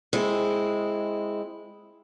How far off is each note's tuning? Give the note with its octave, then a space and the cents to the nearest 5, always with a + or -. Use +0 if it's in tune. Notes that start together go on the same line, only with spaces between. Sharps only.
G#3 +0 C4 +0 E4 +0